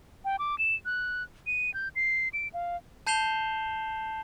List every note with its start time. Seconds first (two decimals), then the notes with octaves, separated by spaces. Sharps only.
0.25 G5
0.39 D6
0.59 E7
0.85 F#6
1.47 D#7
1.74 G6
1.96 C7
2.33 D7
2.54 F5
3.07 A5 G6 C7 E7 F7 G7